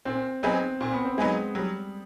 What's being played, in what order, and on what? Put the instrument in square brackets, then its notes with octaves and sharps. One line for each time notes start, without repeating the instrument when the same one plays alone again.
[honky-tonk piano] A#2 [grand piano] C4
[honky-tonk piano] F#3 B3 D#4 G#4 [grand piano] C4
[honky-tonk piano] A#2 [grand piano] C4
[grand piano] B3
C4
[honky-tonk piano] F#3 B3 D#4 G#4 [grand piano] G#3
[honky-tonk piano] F#3 [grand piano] G3